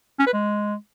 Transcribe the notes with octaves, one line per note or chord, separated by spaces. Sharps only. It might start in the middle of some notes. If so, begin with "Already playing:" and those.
C#4
B4
G#3